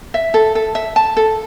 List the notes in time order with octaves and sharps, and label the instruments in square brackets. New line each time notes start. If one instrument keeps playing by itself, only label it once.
[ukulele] E5
A4
A4
E5
A5
A4